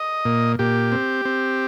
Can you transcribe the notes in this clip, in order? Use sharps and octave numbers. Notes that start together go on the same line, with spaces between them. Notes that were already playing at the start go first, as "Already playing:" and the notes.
Already playing: D#5
A#2
A#2 G4
C4
C4